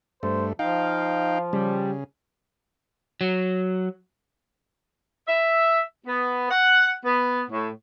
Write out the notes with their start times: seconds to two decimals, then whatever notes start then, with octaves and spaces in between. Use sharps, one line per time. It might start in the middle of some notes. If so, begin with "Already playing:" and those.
0.23 G2 A3 C5
0.59 F3 D#4 F5 G5
1.53 C#3 G3
3.21 F#3
5.27 E5
6.07 B3
6.51 F#5
7.04 B3
7.50 A2